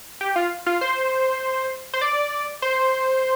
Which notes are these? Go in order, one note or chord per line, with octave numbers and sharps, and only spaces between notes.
G4
F4
F4
C5
C5
D5
C5